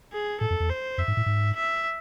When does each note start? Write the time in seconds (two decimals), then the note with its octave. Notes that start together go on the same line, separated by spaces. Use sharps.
0.13 G#4
0.41 A2 A4
0.50 F2
0.60 E2
0.70 C5
0.98 F2 E5
1.08 G#2
1.17 A2
1.26 G#2
1.56 E5